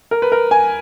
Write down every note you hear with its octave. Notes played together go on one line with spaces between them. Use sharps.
A#4
B4
A#4
G#5